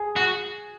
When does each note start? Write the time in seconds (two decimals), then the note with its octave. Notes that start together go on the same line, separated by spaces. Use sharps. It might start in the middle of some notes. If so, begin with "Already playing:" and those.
Already playing: G#4
0.16 F#4